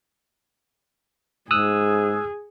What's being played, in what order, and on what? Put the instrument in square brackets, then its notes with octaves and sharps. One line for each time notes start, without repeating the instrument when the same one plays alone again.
[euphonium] G#2 [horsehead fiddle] G#4 [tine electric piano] D#6 E6 F#6